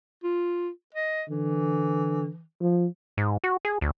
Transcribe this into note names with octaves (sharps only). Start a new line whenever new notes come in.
F4
D#5
D3 E3
F3
G#2
F#4
G#4
D2